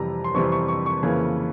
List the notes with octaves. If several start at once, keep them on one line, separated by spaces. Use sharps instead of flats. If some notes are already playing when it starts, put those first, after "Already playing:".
Already playing: F2 C3 E3 G3 A#5
C6
F2 C3 E3 G3 C#6
C#6
C#6
C#6
F2 C#3 E3 A#3 C#4